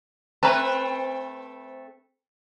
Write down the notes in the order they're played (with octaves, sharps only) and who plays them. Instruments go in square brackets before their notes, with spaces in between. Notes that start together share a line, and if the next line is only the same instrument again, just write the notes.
[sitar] A3 C4 B4 [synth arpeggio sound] A5 A#5